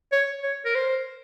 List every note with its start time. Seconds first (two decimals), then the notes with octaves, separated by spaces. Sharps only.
0.12 C#5
0.43 C#5
0.65 A#4
0.75 C5